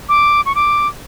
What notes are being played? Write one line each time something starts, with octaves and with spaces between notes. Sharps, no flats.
D6
C#6
D6